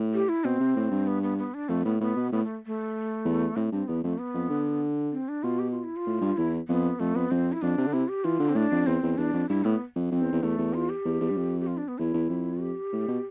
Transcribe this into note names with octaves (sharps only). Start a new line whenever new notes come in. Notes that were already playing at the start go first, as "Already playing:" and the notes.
Already playing: A2
G4
E4
B2 C4
C3
A2
G2
B3
B3
B3
D4
F2 A3
A2 B3
A2 B3
B2
A2 B3
A3
A3
E2
A2 C4
G2 C4
E2 B3
F2 A3
B3
F2
D3
C4
D4
B2 F4
G4
F4
E4
F4
A2
G2
E2 E4
F2 B3
F2 A3
F2 B3
F2 C4
E4
F2 D4
C3
D3
C3 E4
G4
E3 F4
D3
C4
A2 D4
F2
E2 C4
E2
E2 D4
F2
G2 E4
A2 B3
F2
F2 C4
E2
E2
E2 A3
E2
F4
G4
E2
E2
G2
F2
G4
F4
D4
B3
E2 E4
E2
F2
G4
A2
B2